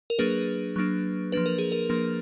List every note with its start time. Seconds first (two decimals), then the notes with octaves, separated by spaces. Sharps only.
0.10 A#4
0.19 F#3 A#3 D4 G#4 B4
0.76 F#3 A#3 D4
1.32 F3 A#3 D4 B4
1.46 A#4
1.58 G#4
1.72 A#4
1.90 F3 A#3 D4